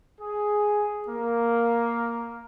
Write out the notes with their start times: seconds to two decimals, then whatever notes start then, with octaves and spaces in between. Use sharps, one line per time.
0.20 G#4
1.09 A#3